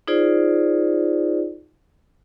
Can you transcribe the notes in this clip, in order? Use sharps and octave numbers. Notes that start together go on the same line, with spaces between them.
D#4 F4 G#4 C5 D5